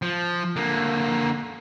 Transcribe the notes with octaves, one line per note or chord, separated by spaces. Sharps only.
F3
D3 A#3